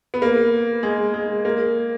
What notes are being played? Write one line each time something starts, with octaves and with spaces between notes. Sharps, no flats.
B3
A#3
G#3
G#3
A#3